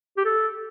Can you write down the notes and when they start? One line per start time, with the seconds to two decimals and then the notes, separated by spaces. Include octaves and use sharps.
0.17 G4
0.25 A4